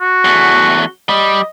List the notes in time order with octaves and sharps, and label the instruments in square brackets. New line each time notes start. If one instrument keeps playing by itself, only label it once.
[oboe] F#4
[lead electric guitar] E2 A3
[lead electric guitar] G3 [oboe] D#5